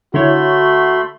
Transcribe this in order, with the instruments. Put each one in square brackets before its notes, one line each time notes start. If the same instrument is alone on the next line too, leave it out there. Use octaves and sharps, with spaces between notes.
[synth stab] D3 E4 C#5 [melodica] A3 B5 C6 [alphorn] F#4